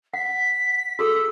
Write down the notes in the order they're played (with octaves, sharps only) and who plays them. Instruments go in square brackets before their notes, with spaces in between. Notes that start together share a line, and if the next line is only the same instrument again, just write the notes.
[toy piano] F#5 [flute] B6
[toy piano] F#4 G#4 A4 [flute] E6